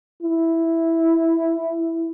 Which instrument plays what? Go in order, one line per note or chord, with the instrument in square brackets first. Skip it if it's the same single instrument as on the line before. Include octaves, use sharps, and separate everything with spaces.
[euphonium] E4